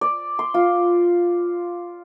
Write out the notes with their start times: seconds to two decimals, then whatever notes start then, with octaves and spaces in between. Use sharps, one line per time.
0.01 D5
0.39 C6
0.54 F4